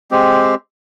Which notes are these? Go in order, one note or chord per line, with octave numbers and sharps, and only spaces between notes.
G#3 C4 G4